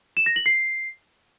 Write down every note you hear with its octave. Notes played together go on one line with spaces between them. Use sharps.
E7
A#6
F#7
C7